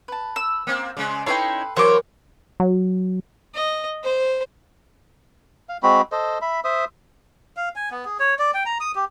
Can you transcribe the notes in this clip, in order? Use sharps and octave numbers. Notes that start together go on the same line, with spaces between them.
B4 A5
E6
A#3 C4
C#3 G#3 D5
D#4 E4 A4 B4 C#5 G5 C6
E3 F#3 A#4 C5 C#5 F5 C6 D6
F#3
D#5
C5
F5
G#3 C4 F#4 B5
A4 C5 D#5
E5 B5
C5 E5 D#6
F5
G#5
B3
G#4
C#5
D5
G5
A#5
D#6
G4